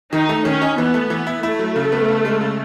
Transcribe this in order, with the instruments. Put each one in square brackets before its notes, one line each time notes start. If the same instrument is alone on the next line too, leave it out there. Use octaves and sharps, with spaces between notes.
[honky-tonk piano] D#3 [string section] D#4
[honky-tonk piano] A3
[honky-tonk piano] D#3 [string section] C#4
[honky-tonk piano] D#4
[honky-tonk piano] E3 [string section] B3
[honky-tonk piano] A3
E3
E4
[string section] A3 [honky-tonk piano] E4
[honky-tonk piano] F#3
C#3
B3
C#3
G#3
C#3